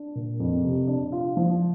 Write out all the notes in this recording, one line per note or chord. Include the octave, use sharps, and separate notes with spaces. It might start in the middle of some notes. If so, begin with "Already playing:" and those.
Already playing: D4
A#2
F2
C3
D4
F4
F3